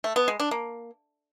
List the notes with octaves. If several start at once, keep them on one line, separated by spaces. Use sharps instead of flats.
A3
B3
G#3
D4
A#3